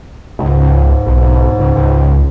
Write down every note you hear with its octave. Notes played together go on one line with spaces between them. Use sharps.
C#2 G#2
B1
C#2
C#2